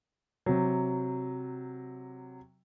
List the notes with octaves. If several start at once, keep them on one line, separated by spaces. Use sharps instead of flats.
C3 F#3